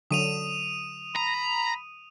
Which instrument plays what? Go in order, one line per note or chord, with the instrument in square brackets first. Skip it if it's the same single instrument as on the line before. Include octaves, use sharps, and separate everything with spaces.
[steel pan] D3 F#3 [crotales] D#6 D#7 F7
[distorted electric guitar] A#5 [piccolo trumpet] B5